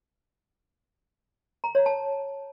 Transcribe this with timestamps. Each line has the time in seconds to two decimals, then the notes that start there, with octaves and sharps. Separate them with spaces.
1.64 A#5
1.75 C#5
1.86 A5